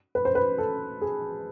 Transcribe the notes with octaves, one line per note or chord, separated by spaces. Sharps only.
B4
C5
B4
A4
G#4